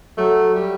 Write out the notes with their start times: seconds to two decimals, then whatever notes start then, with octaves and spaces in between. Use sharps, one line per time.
0.18 F#3 A3
0.55 G3